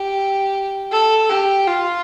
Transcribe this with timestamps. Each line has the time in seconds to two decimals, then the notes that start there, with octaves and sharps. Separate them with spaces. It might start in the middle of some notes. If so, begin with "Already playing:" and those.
Already playing: G4
0.91 A4
1.29 G4
1.67 F4